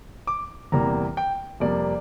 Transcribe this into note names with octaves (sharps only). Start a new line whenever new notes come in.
D6
E2 C3 G3 A#3 A#5
G5
F2 C3 G3 A#3 D5